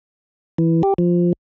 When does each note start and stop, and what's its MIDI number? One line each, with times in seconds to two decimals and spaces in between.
0.58 0.82 52
0.83 0.94 67
0.98 1.33 53